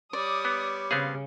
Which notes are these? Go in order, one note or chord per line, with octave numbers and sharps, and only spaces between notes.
G3 C#5 D5 D#6
B3
C#3 B3 C4 G#4 F5